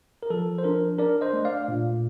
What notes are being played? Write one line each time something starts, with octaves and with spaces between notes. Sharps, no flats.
A#4
F3 A4
C5
D4 A#4
D4 A#4 D5
C5 D#5
A3
D5 F5
A#2